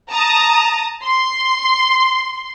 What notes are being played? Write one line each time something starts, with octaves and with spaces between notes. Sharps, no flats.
A5 A#5 D#6
C6